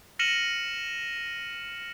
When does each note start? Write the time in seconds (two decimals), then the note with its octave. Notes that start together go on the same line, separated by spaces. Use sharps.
0.19 F6 A#6 C#7 D#7 E7 F#7